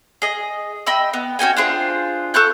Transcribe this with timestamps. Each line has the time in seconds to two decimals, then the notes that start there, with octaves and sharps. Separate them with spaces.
0.22 G#4 D#5
0.86 D#5 G5 B5 E6
1.13 B3
1.39 C#4 F#4 G5 G#5
1.57 D4 F4 G#4 C5
2.34 A4 C#6 F#6 G6